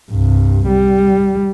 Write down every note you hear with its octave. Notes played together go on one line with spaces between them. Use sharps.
C2 G2
G3